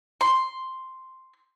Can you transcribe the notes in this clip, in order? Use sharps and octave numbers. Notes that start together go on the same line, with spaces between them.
C6